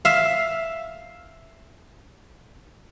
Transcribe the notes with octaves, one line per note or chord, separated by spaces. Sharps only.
E5 F5